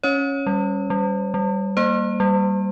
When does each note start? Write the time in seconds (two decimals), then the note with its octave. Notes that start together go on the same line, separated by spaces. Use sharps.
0.03 C#4 C#5
0.47 G3
0.90 G3
1.34 G3
1.77 A#3 C5
2.20 G3